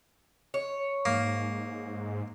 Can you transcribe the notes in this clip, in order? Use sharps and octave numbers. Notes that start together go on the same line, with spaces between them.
C#5
G#2 A#3